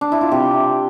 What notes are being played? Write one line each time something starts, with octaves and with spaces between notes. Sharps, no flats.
D4
E4
F4
C3 G4